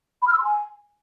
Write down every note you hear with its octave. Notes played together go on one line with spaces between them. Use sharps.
B5
F6
E6
C6
G#5